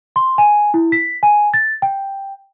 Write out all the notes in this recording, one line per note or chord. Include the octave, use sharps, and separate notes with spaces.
C6
G#5
E4
B6
G#5
A6
G5